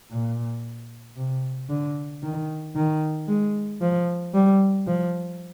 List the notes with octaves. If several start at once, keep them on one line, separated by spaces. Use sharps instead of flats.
A#2
C3
D3
D#3
D#3
G#3
F3
G3
F3